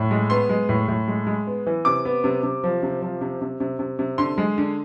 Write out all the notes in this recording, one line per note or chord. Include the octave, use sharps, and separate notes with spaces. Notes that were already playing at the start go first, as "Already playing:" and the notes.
Already playing: A2
G#3
B3 C6
G#3
A2
A2
G#3
G#3
B3
E3
C3 D6
B3
C3
C3
F3
C3
F3
C3
C3
C3
C3
C3
D3 C6
G#3
D3